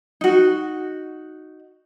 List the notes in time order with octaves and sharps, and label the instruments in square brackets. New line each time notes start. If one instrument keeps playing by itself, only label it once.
[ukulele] D#4 F#4